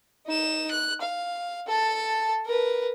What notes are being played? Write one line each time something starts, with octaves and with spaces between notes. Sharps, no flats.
D#4 E7
F#6
F5
A4 A5
A#4 B4